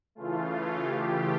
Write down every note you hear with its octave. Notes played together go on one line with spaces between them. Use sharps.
C#3 E3 A3 F4
G4